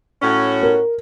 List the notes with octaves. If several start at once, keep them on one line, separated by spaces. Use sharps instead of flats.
A2 C#4 F#4
A#4